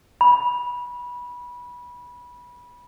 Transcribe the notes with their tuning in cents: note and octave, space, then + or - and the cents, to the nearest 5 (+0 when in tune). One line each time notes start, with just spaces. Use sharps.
B5 -20